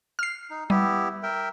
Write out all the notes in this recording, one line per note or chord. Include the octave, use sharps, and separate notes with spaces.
F6 C7
D#4
G3 B3 E4 G4
A#4 E5 G5